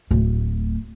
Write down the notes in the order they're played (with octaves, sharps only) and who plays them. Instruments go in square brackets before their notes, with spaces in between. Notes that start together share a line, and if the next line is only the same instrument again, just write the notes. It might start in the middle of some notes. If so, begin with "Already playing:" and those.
[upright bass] D1 A3